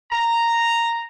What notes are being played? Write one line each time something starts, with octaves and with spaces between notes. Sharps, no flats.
A#5